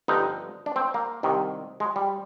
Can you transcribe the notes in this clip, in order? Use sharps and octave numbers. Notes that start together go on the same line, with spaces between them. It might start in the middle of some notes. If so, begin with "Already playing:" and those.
G1 G2 D3 F3 D#4
D4
C4
A#3
C2 C3 D#3
G#3
G3